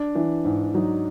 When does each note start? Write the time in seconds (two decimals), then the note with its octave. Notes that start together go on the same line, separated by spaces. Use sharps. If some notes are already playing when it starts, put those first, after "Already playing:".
Already playing: D4
0.15 E3
0.45 G#2
0.74 F#3 D#4